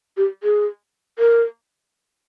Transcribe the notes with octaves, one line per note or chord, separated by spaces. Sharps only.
G4
G#4
A#4